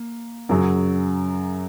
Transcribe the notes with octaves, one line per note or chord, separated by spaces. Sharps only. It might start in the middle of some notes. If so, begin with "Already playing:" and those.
Already playing: A#3
F#2 C#3 F#3